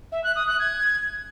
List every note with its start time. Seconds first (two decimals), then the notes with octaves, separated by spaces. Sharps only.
0.12 E5
0.24 F#6
0.36 D#6
0.48 F#6
0.59 G#6